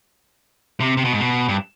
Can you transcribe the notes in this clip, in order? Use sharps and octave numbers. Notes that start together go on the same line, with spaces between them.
C3
C3
B2
G#2
B2
G2